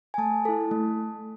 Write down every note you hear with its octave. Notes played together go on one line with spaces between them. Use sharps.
G#5
A3 A5
E4 A4
A3